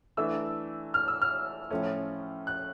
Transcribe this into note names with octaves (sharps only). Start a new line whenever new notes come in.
E3 A3 D4 E6
F6
E6
F6
A2 F3 A3 C#4
F#6